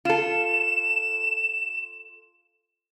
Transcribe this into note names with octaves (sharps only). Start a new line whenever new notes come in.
F4 A4 E7